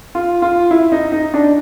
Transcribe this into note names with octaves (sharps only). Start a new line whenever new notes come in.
F4
F4
E4
D#4
D#4
D4